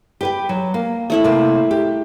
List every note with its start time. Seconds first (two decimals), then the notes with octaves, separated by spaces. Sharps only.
0.21 G4 B4 G5
0.49 F#3
0.74 A#3
1.10 A3 E4 E5
1.24 C3 A#3 C4
1.71 G4